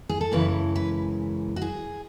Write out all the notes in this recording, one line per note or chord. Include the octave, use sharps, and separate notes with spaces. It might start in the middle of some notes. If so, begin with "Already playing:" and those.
G#4
A4
F#2 C#3 E3 G#3 B4
B4
F#4
G#4